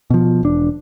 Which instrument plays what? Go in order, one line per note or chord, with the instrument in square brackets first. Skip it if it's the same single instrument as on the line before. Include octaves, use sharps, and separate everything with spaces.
[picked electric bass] B2 F3
E1 D4